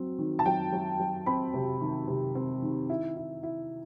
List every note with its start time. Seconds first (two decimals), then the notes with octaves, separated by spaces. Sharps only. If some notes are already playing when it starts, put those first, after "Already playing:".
Already playing: F#3 C4
0.19 D#3
0.39 A5
0.45 F#3 G5
0.73 F#3
1.00 F#3
1.26 C4 B5
1.54 C3
1.81 D#3
2.08 C3
2.35 C4
2.62 D#3
2.90 E4
3.16 E4
3.43 E4